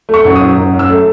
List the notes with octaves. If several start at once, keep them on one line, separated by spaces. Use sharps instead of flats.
A3 C#6
F#2
D#6
F#2
F#2
F#2
E6
A3